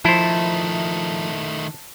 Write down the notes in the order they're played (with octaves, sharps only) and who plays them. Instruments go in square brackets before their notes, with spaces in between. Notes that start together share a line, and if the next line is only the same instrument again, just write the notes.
[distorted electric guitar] D#3 A3 [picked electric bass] F3 [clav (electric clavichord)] E4 C5 [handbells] A5